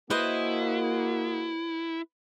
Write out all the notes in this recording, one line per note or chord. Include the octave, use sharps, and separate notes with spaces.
A#3 E4 F#4 G#4 B4 C5 D#5